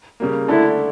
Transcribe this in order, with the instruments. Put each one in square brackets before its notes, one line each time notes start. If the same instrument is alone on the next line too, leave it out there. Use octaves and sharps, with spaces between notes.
[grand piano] C#3 G3 A#3
[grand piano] D3 A3 D4 A4 [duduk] E4